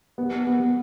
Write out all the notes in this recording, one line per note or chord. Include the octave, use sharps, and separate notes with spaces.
B3
B3